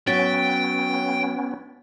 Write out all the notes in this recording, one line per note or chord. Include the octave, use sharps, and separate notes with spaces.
F#3 B3 C#4 G5 A6 B6 D7